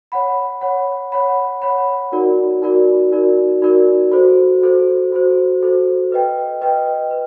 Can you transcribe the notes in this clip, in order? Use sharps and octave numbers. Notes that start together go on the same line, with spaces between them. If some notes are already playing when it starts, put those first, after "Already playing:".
C#5 F#5 B5
C#5 F#5 B5
C#5 F#5 B5
C#5 F#5 B5
D#4 F#4 A#4 D5
D#4 F#4 A#4 D5
D#4 F#4 A#4 D5
D#4 F#4 A#4 D5
F#4 A4 C5
F#4 A4 C5
F#4 A4 C5
F#4 A4 C5
B4 D#5 G5
B4 D#5 G5
B4